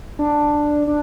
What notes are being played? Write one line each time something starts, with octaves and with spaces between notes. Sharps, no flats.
D4
D4